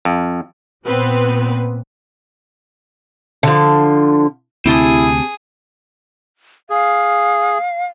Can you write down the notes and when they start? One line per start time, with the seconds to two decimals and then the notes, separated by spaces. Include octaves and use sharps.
0.05 F2
0.85 A#2 B3 C4 B4
3.43 D3 F3
4.66 D2 C3 C4 E4 G4 G#4 A5 D#6
6.70 G#4 F5